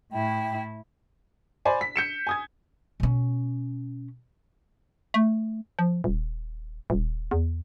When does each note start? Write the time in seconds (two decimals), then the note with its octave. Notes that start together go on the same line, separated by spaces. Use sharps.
0.12 A2 E4 G5
1.65 C5 D5 G#5 B5
1.81 B6
1.96 G6 C#7 E7
2.27 G#5 D#6 G#6
3.00 B2 C#4
5.14 A3
5.79 F3
6.04 D#1
6.90 D#1
7.31 E2